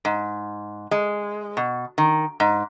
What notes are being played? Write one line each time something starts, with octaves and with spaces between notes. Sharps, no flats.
G#2
G#3
B2
D#3
G#2